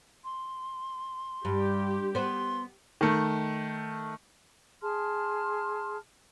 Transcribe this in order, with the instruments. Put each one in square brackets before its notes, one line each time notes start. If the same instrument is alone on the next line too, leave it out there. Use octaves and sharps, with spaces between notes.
[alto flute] C6
[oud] G2 [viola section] G4
[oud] B3 C5 [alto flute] C6
[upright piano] D#3 A3
[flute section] G#4 A5 C6 F6